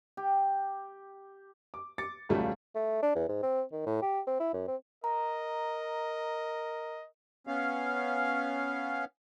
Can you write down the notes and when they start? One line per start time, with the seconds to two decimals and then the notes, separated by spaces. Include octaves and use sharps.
0.17 G4
1.74 D6
1.98 D6 A6 C#7
2.29 E1 C#2 G3 A3 F4
2.75 A3
3.03 D4
3.15 E2
3.29 G#2
3.43 C4
3.72 D#3
3.86 A2
4.02 G4
4.27 C4
4.40 E4
4.54 F#2
4.68 C4
5.04 A#4 D#5 A#5
7.47 B3 C#4 F5